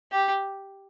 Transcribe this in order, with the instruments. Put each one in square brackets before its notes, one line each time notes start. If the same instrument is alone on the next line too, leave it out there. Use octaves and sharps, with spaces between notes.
[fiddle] G4